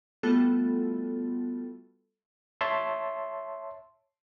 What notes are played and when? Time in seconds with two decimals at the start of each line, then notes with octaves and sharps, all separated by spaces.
0.23 G3 A3 B3 F4 F#4 A4
2.61 C#5 E5 A5 C6